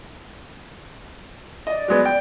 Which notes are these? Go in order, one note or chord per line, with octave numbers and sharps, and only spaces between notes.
D5 D#5
F#3 G#3 B3
G5